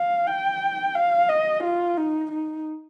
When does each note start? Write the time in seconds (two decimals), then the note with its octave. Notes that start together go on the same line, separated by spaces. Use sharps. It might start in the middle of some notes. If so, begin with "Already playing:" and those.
Already playing: F5
0.27 G5
0.95 F5
1.29 D#5
1.63 F4
1.97 D#4
2.31 D#4